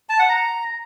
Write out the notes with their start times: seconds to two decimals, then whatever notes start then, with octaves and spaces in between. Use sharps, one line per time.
0.09 A5
0.19 F#5
0.29 A#5